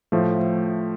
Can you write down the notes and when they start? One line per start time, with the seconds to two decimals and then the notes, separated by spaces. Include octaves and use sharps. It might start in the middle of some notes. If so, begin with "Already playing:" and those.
0.12 A2 F3 A3